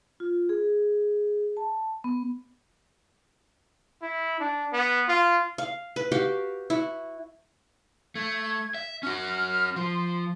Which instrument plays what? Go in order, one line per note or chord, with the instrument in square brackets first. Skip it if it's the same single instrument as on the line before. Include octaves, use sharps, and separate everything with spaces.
[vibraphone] F4
G#4
A5
B3
[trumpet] E4
D4
B3
F4
[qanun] F5
B4
F#4 G4 F5 G5
E4 F#4
[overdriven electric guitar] A3 [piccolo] G#6
[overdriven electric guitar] E5
[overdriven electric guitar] C#4 F#4 [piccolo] F6
[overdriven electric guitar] F3 [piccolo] C6